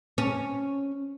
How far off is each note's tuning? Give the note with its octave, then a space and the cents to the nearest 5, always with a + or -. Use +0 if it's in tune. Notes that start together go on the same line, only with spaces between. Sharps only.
C#4 -5